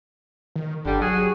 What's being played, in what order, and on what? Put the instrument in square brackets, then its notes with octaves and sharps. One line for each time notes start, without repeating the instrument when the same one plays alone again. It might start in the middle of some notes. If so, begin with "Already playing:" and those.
[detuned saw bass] D#3
[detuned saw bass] G1 [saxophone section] D3 G3
[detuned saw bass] F#3 [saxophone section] F#4 G#4